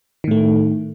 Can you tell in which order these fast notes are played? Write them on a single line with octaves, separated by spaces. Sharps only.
D#3 A2 A3